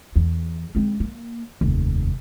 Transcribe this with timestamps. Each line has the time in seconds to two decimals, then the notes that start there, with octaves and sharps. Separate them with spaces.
0.16 E2
0.75 G#3 C4
1.00 A#3
1.61 F1 D#2